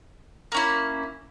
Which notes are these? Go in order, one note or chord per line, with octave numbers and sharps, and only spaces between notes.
A#3 C#4 E4